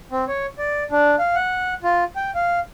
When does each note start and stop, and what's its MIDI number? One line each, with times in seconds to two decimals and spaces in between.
0.11 0.25 60
0.28 0.46 73
0.58 0.84 74
0.91 1.16 62
1.19 1.35 77
1.35 1.74 78
1.84 2.04 65
2.16 2.31 79
2.35 2.59 77